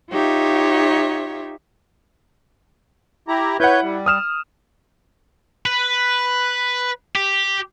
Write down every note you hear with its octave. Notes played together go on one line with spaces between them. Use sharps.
D#4 F4 G4 C#5 E5
E4 G4 A#5
E4 B4 C#5 F#5 G6
G3
D#6 F6 E7
B4
G4